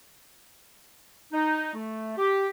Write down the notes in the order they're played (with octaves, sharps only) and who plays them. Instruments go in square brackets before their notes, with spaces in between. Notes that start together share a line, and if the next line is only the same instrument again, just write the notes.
[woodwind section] D#4
A3
G4